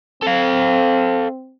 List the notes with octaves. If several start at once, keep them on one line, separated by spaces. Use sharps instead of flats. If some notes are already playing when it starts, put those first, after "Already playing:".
C4 A4 F5